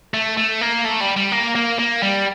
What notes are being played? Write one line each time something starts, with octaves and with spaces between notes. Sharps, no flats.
A3
A3
A#3
A3
G3
G3
A#3
A#3
A#3
G3